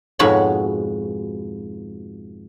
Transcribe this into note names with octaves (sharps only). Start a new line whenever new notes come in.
F2 G#2 B2 F#4 C#5 B5